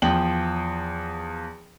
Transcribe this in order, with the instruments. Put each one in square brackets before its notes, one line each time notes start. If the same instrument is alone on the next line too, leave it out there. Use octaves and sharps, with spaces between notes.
[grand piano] E2 F3 G5 F#7